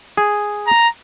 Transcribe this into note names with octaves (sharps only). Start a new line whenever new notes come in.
G#4
A#5